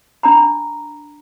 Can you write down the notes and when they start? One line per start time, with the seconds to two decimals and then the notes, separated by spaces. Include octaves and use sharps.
0.23 D4 A#5 B5